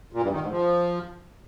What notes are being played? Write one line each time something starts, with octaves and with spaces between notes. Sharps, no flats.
A#2
G2
D#3
G#2
F3